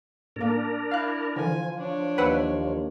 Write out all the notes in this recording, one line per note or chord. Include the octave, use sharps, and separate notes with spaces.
A2 A#3 D4 A#4
E4 F5 F#6
D3 E3 F3 G#5
D4 C#5
D#2 B4 F#5 E6